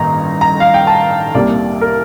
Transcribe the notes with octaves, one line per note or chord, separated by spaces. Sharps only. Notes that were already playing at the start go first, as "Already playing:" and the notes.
Already playing: A1 G2 D#3 A#3 D#4 A#5
A#5
F5
G5
A5
C2 C3 G3 A#3 D5
A#4